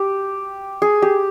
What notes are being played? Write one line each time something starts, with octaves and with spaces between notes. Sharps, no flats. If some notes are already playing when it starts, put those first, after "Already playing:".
Already playing: G4
G#4
G4